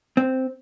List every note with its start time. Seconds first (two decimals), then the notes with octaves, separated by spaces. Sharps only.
0.17 C4